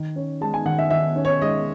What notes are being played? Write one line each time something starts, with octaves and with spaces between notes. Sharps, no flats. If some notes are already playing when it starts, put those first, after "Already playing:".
Already playing: D#3
C#4
G#3 A5
G#5
D#3 F#5
E5
D#3 E5
C#4
C#5
G#3 D#5